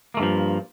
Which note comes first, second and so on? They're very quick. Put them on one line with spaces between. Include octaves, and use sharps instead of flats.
A#3 A3 G2 F3